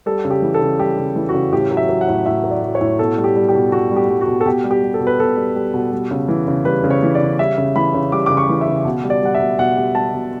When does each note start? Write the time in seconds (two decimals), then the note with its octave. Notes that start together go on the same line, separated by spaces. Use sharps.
0.06 G3 A4
0.25 C#3
0.30 G4
0.42 E3
0.54 A4
0.61 C#3
0.79 G3 G4
0.97 C#3
1.16 E3
1.29 F#4
1.34 C#3
1.53 A2 G4
1.71 F#3
1.77 E5
1.89 F#3
2.01 F#5
2.08 A2
2.26 A2 E5
2.44 F#3
2.51 D5
2.63 F#3
2.75 C#5
2.81 A2
2.99 B2 A4
3.17 G3
3.24 G4
3.36 G3
3.49 G4
3.55 B2
3.72 B2 F#4
3.91 G3
3.96 G4
4.09 G3
4.21 F#4
4.27 B2
4.41 A4
4.46 B2 G4
4.64 G3
4.71 G4
4.83 G3
4.94 A4
5.00 B2
5.07 B4
5.20 B2 A4
5.37 G3
5.56 G3
5.74 B2
5.93 G3
6.11 C#3
6.29 E3
6.48 C#3
6.65 G3 B4
6.84 C#3
6.90 C#5
7.03 E3
7.15 D5
7.21 C#3
7.39 G3 E5
7.58 C#3
7.76 E3 B5
7.94 C#3
8.12 G3 D6
8.26 C#3 D6
8.37 C#6
8.49 E3
8.61 E5
8.67 C#3
8.85 B2
9.04 G3
9.10 D5
9.23 G3 F#5
9.35 E5
9.40 B2
9.59 B2 F#5
9.77 G3
9.95 G3 A5
10.14 B2